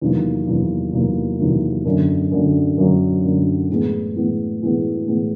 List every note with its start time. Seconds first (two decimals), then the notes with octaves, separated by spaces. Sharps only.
0.01 E2 C3 D#3 F#3 A#3
0.47 E2 C3 D#3 F#3 A#3
0.93 E2 C3 D#3 F#3 A#3
1.39 E2 C3 D#3 F#3 A#3
1.85 F#2 D3 F#3
2.31 F#2 D3 F#3
2.77 F#2 D3 F#3
3.24 F#2 D3 F#3
3.70 A2 E3 G#3 B3
4.16 A2 E3 G#3 B3
4.62 A2 E3 G#3 B3
5.08 A2 E3 G#3 B3